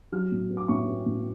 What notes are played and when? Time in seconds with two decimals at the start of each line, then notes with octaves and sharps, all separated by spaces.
0.12 F#3 F6
0.31 A2
0.50 B3
0.57 D6
0.68 A2 C#6
0.87 B3
1.06 A2